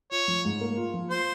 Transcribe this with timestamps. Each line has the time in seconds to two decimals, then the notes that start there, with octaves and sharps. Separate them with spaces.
0.11 F4 C#5
0.28 F3
0.45 G#2
0.61 A#3
0.77 F4
0.94 F3
1.10 F4 C5